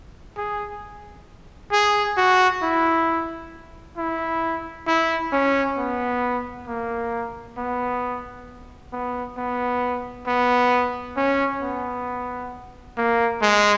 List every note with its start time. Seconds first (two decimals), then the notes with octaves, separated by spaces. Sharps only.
0.37 G#4
1.72 G#4
2.17 F#4
2.63 E4
3.97 E4
4.87 E4
5.32 C#4
5.77 B3
6.67 A#3
7.57 B3
8.93 B3
9.37 B3
10.27 B3
11.17 C#4
11.62 B3
12.97 A#3
13.42 G#3